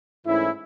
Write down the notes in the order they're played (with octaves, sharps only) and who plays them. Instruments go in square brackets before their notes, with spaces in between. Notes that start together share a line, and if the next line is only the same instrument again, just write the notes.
[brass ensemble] G#2 E3 A3 C#4 E4